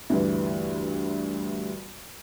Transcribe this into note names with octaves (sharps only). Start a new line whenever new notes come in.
D2 G2 E3